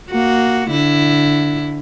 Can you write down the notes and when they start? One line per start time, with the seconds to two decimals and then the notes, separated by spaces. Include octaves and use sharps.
0.11 A#3 F#4
0.70 D3 E4